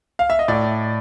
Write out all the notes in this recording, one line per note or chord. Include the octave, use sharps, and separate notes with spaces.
F5
E5
D#5
A2 D5